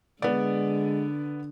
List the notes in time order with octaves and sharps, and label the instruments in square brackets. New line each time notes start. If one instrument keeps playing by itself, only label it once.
[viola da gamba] D3 [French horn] G#3 [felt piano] B3 D5